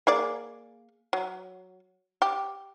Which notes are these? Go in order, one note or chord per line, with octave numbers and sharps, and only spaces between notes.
A#3 G#4 D5
F#3
G4